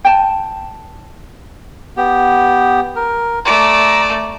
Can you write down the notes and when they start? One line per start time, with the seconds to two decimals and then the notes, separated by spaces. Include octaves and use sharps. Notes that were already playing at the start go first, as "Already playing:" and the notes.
0.05 G5 A5
1.97 B3 G4
2.96 A#4
3.45 A3 D5 A#5